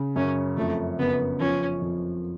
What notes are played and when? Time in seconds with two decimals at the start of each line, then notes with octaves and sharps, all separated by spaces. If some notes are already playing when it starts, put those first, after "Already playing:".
Already playing: C#3
0.16 F#2 C#4
0.57 F2 A3
0.99 F#1 B3
1.39 F3 C#4
1.82 F2